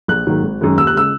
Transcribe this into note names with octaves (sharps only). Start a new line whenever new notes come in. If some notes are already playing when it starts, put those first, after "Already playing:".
A#1 F#6
G#2 D#3 F#3 A#3
G#1
F#2 D#3 G#3
D#2 E6
F#6
C#3 G#3 E6